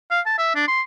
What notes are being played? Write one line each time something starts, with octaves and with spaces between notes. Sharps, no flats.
F5
A5
E5
D4
C6